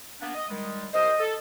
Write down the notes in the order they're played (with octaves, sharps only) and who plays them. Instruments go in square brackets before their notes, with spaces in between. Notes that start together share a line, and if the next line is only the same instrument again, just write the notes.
[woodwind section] A#3 B3 D4
D#5
D#3 G3 G#3
[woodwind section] C2 A#4 C5 [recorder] D#5
[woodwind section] A4